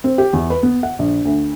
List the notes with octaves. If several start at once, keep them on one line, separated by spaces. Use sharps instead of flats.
C4
G4
E2
B4
B3
F#5
A#1
D2